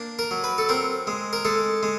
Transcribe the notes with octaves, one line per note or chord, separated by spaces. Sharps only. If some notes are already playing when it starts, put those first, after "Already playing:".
Already playing: A#3 D4
A#4
F#3
B4
A4
C4 A#4
G#3
A#4
G#3 A4
G#3